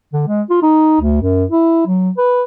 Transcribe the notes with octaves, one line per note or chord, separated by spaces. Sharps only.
D3
G#3
F4
D#4
D2
F#2
E4
F#3
B4